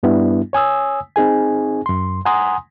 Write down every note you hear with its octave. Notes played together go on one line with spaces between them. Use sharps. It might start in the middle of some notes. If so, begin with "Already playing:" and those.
G2 G3 B3 D4 E4
C#5 G#5 D#6 E6
C4 D#4 G#4 G#5
F#2 C6
F#5 G#5 A#5 C6 D#6